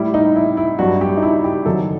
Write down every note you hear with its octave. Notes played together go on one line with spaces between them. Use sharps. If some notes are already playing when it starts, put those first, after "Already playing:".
Already playing: A2 G3 E4
D#4
E4
E4
G2 F#3 F#4
G4
D#4
E4
G4
F#2 D#3 F#3 A4